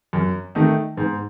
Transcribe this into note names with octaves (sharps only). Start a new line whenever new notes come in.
F#2
D#3 A3 D#4
G#2